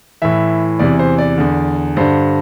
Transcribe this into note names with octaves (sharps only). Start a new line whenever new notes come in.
A2 E3 E5
E2 C3 E3 D5
C5
D5
E2 D3
G2 D3 C5